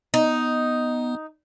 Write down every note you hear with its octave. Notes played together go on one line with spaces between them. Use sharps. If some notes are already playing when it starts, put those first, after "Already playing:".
B3 D#4